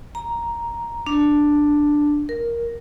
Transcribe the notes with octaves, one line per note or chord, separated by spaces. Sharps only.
A#5
D4
A#4